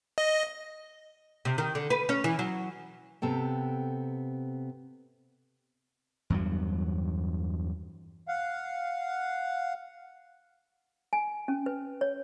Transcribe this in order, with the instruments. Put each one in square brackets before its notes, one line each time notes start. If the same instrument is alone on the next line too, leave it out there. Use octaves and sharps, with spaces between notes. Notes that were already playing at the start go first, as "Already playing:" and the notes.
[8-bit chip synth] D#5
[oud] C3
D#3
D3
B4
C#4
E3
F#3
[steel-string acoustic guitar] C3 B3 A4 G5
[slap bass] E2 G2 F#3
[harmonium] F5 F#5
[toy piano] G#5
C#4
B4
C#5